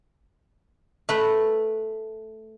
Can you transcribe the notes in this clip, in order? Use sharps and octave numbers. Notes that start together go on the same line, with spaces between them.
A3 B4